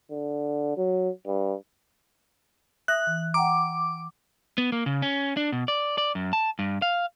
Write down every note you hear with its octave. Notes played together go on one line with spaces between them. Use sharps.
D3
F#3
G2
E5 D#6 F#6 A#6
E3
F#5 G5 A#5 D6
B3
A#3
C#3
C#4
D4
B2
D5
D5
F#2
A5
G2
F5